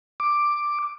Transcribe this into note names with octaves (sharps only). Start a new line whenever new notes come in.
D6